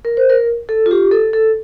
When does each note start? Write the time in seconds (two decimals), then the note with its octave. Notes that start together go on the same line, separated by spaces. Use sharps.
0.05 A#4
0.17 C5
0.30 A#4
0.69 A4
0.86 F4
0.91 G4
1.11 A4
1.33 A4